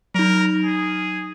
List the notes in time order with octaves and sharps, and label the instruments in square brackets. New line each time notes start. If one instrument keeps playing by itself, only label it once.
[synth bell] F#3 D#4 [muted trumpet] A#4
[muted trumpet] G#4